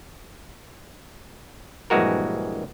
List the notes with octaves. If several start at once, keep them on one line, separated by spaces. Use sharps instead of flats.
A#1 G2 E3 G#3 F#4 A#4